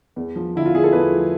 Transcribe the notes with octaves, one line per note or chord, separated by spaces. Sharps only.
E2
F3
D3 E4
F4
E2 G#4
A4
E2 B4
F3